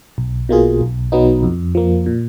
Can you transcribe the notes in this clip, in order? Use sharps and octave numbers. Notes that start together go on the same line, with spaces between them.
B1
B2 A#3 F4 G#4
B1
B2 F#3 B3 D#4
F2
F3 A#3
A#2